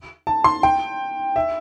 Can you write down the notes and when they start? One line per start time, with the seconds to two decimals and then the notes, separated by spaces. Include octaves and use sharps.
0.27 A5
0.44 C6
0.63 G5
1.36 E5